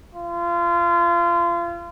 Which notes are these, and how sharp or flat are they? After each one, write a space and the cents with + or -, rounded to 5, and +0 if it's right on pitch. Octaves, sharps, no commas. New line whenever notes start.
F4 -30